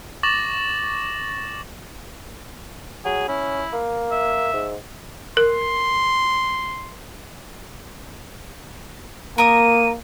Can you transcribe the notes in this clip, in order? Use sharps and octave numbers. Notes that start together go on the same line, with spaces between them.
C#6 D6 A6 A#6 E7 F#7
F#3 G#4
C#4 E4
A#3
E5
G#2
A#4 C6
A#3 A#4 D#6 D#7